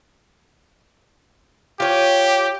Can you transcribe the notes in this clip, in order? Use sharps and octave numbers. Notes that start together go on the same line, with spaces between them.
F4 G4 C#5